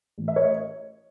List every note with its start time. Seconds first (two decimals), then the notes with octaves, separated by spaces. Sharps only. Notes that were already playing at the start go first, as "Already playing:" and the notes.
0.18 A1
0.28 E5
0.36 C#5 D#5